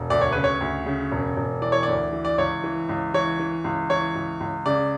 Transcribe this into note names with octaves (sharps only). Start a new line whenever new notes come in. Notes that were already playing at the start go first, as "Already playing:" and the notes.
Already playing: E1
D2 D5
C#5
C#3 B4
C#5
D2
C#3
E1
E1
E3 D5
C#5
D2 D5
E3
D5
C#2 C#5
E3
C#2
E3 C#5
E3
C#2
E3 C#5
C#2
C#2
C#3 D5